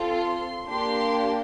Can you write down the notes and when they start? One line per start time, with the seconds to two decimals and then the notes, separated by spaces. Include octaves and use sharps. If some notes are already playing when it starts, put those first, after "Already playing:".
Already playing: C4 F4 A4
0.12 C6
0.67 A#3 D4 G4 C6